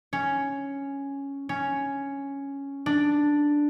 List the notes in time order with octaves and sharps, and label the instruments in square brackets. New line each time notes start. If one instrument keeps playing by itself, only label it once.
[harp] C#4
C#4
D4